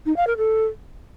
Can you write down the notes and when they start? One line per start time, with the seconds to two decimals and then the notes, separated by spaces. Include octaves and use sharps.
0.06 D#4
0.17 F5
0.27 A#4
0.37 A4